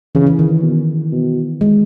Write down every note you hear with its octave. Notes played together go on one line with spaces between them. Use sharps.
C#3 E3
E3
D#3
B2
B2
G#3